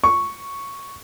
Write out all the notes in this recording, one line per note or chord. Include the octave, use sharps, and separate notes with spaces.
C#6